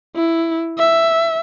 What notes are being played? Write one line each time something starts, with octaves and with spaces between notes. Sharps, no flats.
E4
E5